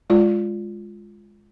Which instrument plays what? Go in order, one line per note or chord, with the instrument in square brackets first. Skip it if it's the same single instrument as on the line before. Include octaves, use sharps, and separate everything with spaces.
[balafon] G#3 F4 D5